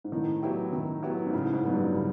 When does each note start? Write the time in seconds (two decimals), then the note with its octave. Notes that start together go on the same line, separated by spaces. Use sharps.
0.04 G#2
0.12 A2 D#3
0.43 F#3 B3 E4 G4
0.73 D#3
1.03 F#3 B3 E4 G4
1.27 G#2
1.33 A2 C#3
1.53 G#2
1.64 F#2 F#3 B3
1.74 G2
1.95 C#3